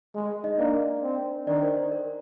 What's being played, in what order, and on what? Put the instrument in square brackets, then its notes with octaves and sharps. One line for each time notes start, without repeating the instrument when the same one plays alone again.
[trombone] G#3
[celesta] D#4 D#5
[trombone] A#3 [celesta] D4 D5
[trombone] C4
[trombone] D#3 [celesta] D4 D5
[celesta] C5
C5
A#4